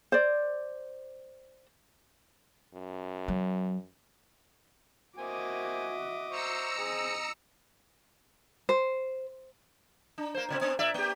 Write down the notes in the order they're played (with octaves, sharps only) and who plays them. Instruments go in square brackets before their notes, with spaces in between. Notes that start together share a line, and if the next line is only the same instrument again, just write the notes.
[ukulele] C5 D5
[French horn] F#2
[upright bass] F#3
[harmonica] A#3 C4 G#5 [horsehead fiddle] F#4 E5 [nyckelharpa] D#5 D6
[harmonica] C5 C#6 [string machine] A#5 E6 C#7
[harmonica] C4 G#4 [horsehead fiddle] D#5
[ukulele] C5
[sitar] D4
A#3 C5
A#2 C#3 C4
B3 C4 D4
A#2 D5 E5
A#3 G4